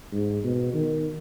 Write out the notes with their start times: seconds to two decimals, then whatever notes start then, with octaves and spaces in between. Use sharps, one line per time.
0.12 G#2
0.43 B2
0.74 D#3